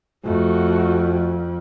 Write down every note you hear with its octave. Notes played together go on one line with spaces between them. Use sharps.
F2 A3 F#4